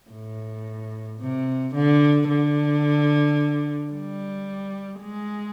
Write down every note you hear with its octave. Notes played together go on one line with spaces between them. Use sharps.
A2
C3
D3
D3
G3
G#3